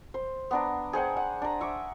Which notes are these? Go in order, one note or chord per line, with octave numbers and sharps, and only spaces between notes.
C5
B3 D4 A#5
G#4 C5 F#5 G5
F#5
D4 A#5
E5 C#6 D6